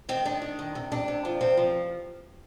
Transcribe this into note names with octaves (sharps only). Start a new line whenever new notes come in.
D#3 C4
D#3 D4
D#3
D#3
C3
C3 D4
C3
F3
C3 C4
F3